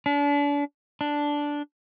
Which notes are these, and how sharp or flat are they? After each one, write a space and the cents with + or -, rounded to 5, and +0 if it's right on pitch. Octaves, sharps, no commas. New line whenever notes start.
D4 -35
D4 -5